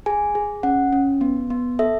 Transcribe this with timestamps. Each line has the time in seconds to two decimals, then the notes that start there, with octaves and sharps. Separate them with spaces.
0.06 G#4 G#5
0.35 G#4
0.63 C#4 F#5
0.93 C#4
1.21 B3
1.50 B3
1.79 A4 E5